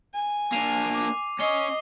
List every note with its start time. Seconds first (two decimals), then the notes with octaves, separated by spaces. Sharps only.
0.14 G#5
0.52 A#3 D4 C7 D#7 F7
0.95 D6
1.40 C#4 D#5 C7 G7